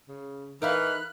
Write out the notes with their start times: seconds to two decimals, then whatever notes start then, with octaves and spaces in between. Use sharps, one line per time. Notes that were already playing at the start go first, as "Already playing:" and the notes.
0.08 C#3
0.62 E3 D#4 A#4 E5 F5 B5 F6 F#6